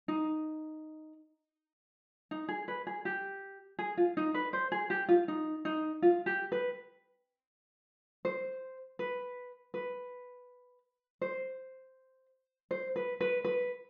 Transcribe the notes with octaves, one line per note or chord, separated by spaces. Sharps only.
D#4
D#4
G#4
B4
G#4
G4
G#4
F4
D#4
B4
C5
G#4
G4
F4
D#4
D#4
F4
G4
B4
C5
B4
B4
C5
C5
B4
B4
B4